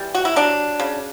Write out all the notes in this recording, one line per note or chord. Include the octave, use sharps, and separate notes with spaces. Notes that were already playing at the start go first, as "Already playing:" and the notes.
Already playing: E3 G3
F#4
E4
F#3 D4
C#3